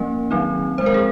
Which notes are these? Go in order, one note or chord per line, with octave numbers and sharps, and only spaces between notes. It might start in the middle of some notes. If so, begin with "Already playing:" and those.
Already playing: F3 A#3 C#4 A#4
D#3 F#3 C4 D#4
F3 G#3 C4 C5
A#4
G#4